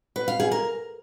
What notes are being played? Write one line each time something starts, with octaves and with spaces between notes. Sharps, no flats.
B4
F5
G#4
A#4